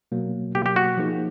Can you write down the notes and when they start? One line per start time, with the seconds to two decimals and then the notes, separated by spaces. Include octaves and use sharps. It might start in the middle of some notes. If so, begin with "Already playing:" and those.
0.12 B2 F#3 A#3
0.55 B2 F#3 A#3 G4
0.66 G4
0.76 F#4
0.97 F3 A#3 D#4 G#4 C5